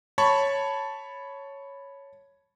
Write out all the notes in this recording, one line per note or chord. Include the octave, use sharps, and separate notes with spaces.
C#5 A5 B5 C#6